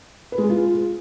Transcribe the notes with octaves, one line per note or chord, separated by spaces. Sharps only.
B4
G#3
G#4
F4